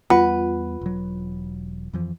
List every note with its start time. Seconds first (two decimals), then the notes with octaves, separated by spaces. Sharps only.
0.10 E2 G3 B3 F4 B4 F#5
0.81 E1 F#3
1.93 F2 E3 F3